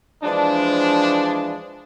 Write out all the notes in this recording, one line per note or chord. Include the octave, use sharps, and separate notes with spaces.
E3 F3 G#3 D4